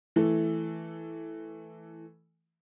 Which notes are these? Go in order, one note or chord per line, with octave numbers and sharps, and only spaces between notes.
E3 A3